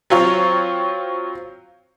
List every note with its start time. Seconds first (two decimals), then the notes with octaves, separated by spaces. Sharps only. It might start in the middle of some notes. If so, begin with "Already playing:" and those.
0.10 F#3 C4 F4 C#5